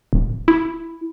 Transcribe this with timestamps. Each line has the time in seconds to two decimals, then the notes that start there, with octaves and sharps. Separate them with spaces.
0.13 D1
0.48 E4